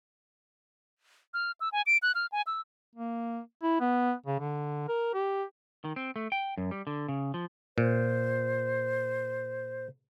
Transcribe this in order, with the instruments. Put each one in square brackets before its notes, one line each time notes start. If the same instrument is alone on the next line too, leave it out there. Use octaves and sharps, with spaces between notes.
[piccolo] F6
E6
G#5
D7
F#6
F6
G#5
E6
[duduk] A#3
E4
B3
C#3
D3
A#4
G4
[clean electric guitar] D#3
C4
A3
G5
F#2
G3
D3
C#3
F3
[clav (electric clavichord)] A#2 [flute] C5